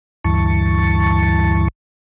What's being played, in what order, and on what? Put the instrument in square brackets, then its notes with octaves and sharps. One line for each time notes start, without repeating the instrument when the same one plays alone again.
[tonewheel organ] D2 G2 E3 A5 C#6